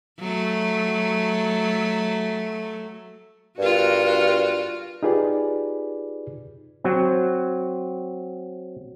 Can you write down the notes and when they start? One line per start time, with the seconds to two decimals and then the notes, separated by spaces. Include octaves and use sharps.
0.19 F#3 A3
3.58 G2 F4 F#4 A#4
5.03 D#4 F4 G4 G#4 B4 D5
6.84 F#3 C4